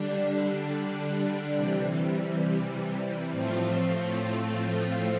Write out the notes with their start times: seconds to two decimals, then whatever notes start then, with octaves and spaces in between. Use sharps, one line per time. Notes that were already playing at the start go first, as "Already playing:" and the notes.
Already playing: D3 G3 D4
1.56 C3 E3 G3
3.32 A2 F3 A3 C4 F4